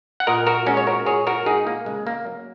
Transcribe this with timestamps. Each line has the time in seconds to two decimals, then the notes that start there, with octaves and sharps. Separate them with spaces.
0.20 F#5
0.27 A#2 A#4 D#5
0.47 F#4 A#4
0.66 G#3 C#4 F#4
0.77 C#5
0.87 F#4 A#4
1.06 A#2 G#4 C#5
1.27 F#4 A#4
1.46 G#3 D#4 G#4
1.67 A#3
1.86 C#3 G#3
2.07 A#3
2.27 F#3